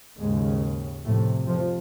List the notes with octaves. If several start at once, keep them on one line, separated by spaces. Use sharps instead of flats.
D#2 G#2 C#3 G#3
F2 A2 C3 A3
F2 F3